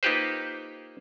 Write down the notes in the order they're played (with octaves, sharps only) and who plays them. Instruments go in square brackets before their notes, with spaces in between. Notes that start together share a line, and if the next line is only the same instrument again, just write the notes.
[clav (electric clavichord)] A#3 D#4 F4 G4 B4 C5